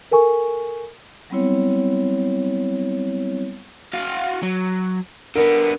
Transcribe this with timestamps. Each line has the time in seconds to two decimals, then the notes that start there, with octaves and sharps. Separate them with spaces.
0.11 A4 A#4 G#5 C#6
1.30 F#3 G3 B3 C4 E4 C#5
3.93 F#4 F5
4.43 F#3
5.35 D3 B3 A#4